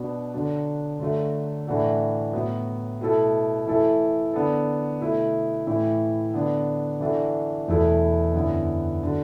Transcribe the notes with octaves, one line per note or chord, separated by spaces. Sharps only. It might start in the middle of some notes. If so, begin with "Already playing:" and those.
Already playing: B2 B3 D4
D3 F#3 D4
D3 F#3 A3
A2 E3 D4 F#4 A4
A2 F#3 B3
B2 A3 E4 A4
E3 A3 E4 A4
D3 B3 D4 A4
B2 A3 E4
A2 E3 A3 E4
D3 B3 D4
E3 D4 F#4 A4
E2 B2 A3 E4 A4
F#2 D3 B3 E4
D3 F#3